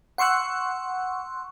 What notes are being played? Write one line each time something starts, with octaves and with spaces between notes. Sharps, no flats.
F#5 C6 C#6 E6 F#6